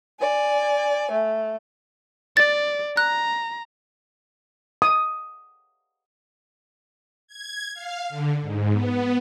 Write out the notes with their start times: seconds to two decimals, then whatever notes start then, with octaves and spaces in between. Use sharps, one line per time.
0.20 D5 G#5
1.11 A3
2.37 D5 A6
2.97 A#5 F#6
4.82 D#6
7.27 G#6
7.74 F5
8.09 D3
8.41 G#2
8.72 B3